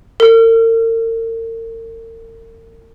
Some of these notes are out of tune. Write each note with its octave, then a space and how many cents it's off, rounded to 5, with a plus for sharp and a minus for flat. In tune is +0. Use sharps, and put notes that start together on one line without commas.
A#4 -45